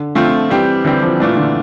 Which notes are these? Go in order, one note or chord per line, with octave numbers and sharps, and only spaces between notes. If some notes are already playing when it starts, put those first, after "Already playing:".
Already playing: D3
D3 F3 A3 C4 F4
E3 G3 C4 G4
D3 E3 G3 C4 G4
F3
A#2 E3 A3 D4 F4
D3